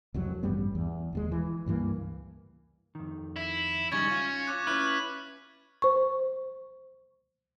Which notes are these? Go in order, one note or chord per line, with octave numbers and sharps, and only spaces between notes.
C2 F2 F#3
A1 G2 G3 B3
E2
E1 D#2 G#3
E3
C#2 G2 E3 A#3
F2 D#3
E4
C#2 G3 C#4 D#4 C#6 G#6 A6
F4
D6 F#6
C#4 E4 B4 F6 F#6
C5 C#6